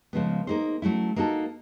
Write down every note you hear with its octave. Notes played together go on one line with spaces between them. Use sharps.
C#3 F3 G#3 B3
A#3 D#4 G#4 C5
F#3 A3 C#4 E4
A#3 D#4 F#4 A4